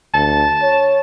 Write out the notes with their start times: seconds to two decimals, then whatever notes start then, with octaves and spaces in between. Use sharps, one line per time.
0.14 D2 A5
0.62 C#5